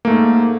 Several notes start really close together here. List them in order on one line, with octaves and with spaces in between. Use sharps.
A#3 A3 G#2